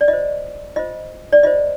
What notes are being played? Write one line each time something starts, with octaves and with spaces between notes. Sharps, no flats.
D5
F4 D#5
C5
F4 C5 D#5
D5
F4 C5 D#5